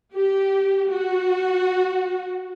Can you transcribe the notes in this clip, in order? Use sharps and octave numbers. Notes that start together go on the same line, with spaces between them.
G4
F#4